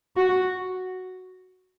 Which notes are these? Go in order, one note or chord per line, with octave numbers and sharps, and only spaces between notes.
F#4